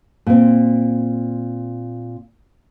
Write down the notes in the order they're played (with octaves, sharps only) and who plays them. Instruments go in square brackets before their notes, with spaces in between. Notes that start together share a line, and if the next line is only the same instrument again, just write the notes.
[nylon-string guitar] A#2 C4